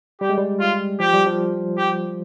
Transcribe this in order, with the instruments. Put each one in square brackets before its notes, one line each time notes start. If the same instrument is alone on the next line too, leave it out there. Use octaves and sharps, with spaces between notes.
[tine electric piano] G3 [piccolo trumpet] G4
[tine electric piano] G#3
G3
[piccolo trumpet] F4
[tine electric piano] F3 [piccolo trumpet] G4
[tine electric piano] G3
F3
[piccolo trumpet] G4